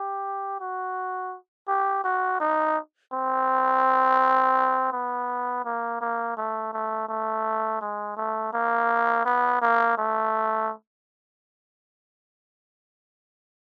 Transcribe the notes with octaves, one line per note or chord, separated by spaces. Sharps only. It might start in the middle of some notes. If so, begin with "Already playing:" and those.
Already playing: G4
F#4
G4
F#4
D#4
C4
B3
A#3
A#3
A3
A3
A3
G#3
A3
A#3
B3
A#3
A3